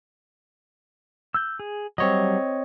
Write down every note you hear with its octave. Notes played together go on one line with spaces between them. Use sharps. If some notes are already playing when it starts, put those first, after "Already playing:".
E6 F#6 G6
G#4
F#3 G3 C4 C#5 D#5